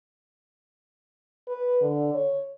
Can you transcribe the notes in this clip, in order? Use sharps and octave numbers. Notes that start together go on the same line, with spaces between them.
B4
D3
C#5